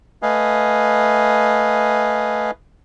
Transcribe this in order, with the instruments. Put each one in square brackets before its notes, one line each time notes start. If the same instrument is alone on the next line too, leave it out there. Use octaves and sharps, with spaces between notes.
[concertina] A3 B4 D#5 F5 G#5